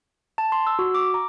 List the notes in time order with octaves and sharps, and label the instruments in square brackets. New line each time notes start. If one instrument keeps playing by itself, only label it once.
[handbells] A5
C6
E6
F#4
D6
A#5